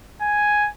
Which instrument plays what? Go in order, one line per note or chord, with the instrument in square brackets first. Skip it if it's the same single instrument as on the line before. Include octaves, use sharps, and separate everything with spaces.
[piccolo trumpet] G#5